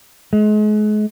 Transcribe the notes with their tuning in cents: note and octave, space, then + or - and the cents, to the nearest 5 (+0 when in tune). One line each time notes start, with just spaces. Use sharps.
G#3 +35